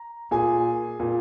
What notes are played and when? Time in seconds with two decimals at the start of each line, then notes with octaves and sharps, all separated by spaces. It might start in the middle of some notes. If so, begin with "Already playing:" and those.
Already playing: A#5
0.31 A#2 G#4 G#5
1.00 A#2